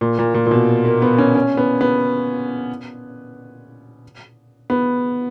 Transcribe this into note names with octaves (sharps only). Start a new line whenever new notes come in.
A#2
A#2
A#2
A#2
B2
A#3
B3
C#4
C#4
B3
B3
B3